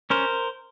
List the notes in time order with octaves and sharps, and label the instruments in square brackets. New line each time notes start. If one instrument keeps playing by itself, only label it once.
[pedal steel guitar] C#4 A#4 C5